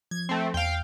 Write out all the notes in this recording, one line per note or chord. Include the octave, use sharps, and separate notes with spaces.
F3 G#6
A3 C4
E2 F5 G5